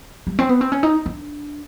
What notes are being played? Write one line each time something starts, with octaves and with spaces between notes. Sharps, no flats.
G3
C4
B3
C4
C#4
D#4
D4